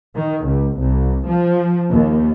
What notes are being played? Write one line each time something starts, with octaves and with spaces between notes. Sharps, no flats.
D#3
C#2
C2
F3
D#2